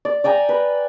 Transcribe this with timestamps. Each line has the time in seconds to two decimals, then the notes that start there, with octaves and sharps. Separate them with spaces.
0.05 D5
0.24 D5 G5 G#5 A#5
0.49 B4